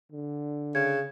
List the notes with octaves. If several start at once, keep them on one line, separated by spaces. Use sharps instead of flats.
D3
C#3 G#6